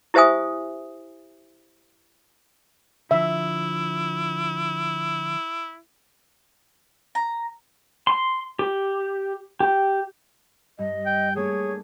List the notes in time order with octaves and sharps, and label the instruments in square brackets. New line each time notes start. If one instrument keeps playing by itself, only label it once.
[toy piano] E4 G4 C5 E5 G#5 D#6
[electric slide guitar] D3 F3 [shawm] E4 [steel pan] E5
[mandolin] A#5
[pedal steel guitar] C6
G4
G4
[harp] G2 [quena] D#5
[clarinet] G5
[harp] A3 A#3 D4 [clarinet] G#4 [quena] C#5